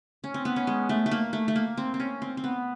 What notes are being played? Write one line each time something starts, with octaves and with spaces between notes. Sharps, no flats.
C#4
C4
B3
C#4
G#3
A3
A3
A#3
A3
A3
A#3
C4
C4
C#4
C4
C4
B3